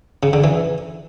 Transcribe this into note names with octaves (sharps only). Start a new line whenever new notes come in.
C#3
D3
E3